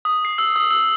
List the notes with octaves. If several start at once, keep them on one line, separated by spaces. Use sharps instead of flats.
D#6
C7
E6
D#6
E6